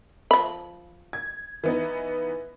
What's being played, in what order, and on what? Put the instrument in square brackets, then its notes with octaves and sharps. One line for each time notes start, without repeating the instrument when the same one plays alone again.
[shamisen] F3 B5
[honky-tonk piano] G#6
E3 B3 D#4